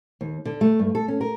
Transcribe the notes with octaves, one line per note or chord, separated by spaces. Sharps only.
D#2
D3
A3
G2
A4
C#4
A#4